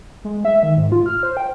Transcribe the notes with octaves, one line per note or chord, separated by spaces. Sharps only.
G#3
E5
D#3
G#2
F4
F6
C5
G5